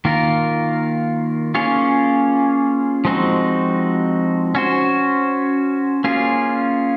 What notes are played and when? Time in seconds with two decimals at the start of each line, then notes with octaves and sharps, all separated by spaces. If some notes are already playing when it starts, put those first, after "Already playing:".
0.05 D#3 A#3 F4 A#4
1.55 A#3 C#4 F4 G#4 C#5
3.05 F3 G#3 C4 D#4 F#4
4.55 C#4 F#4 C5
6.04 A#3 C#4 F4 G#4